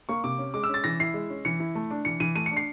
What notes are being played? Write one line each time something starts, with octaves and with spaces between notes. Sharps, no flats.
A#3 C#6
C3 D6
C#4
G#3 D6
E6
C#4
A6
E3 A#6
E4 C7
G#3
C#4
E3 C#7
E4
A3
D4
E3 C#7
E3 D#7
A3 D#7
C#7
D4
C7